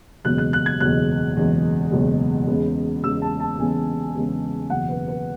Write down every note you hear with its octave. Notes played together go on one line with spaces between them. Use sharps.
F#1 E2 B2 G#3 F#6
F#6
F#6
G#6
F#1 E2 B2 G#3 F#6
F#1 E2 B2 G#3
F#1 E2 B2 G#3
E2 C#3 G#3 B3
E2 C#3 G#3 B3 E6
A5
A5
E2 C#3 G#3 B3 G#5
E2 C#3 G#3 B3
F#1 E2 B2 F#5
B4
B4